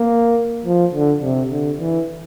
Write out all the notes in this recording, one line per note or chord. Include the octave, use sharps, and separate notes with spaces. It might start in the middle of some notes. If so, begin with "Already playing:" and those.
Already playing: A#3
F3
D3
C3
D3
E3